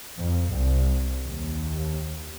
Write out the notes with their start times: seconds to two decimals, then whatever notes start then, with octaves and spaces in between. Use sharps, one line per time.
0.18 F2
0.51 C2
1.27 D#2